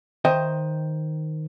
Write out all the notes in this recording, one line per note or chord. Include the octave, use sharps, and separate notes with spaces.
D#3 C5 D#5 E5 G5